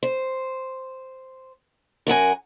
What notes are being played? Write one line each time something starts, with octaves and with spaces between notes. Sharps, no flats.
C5
F#2 A#4 F#5 G#5